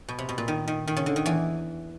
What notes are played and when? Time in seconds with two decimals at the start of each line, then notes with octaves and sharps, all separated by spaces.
0.08 B2
0.19 C3
0.29 B2
0.38 A#2
0.48 D#3
0.68 D#3
0.88 D#3
0.97 C#3
1.06 D3
1.16 D#3
1.26 E2 E3